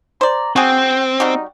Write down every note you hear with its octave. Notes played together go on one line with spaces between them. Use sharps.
C5 D5 A#5
C4 F#4 G#4 G5
G3 D#4 F#4 G4